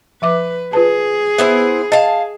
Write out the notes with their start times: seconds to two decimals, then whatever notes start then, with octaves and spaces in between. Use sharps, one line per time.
0.22 F3 B4 E5 D6
0.73 F4 G#4 B4 A5
1.38 B3 E4 C5 E5
1.92 D#5 F5 A5